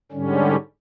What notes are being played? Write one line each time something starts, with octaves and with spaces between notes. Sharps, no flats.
G#2 D3 G3 C#4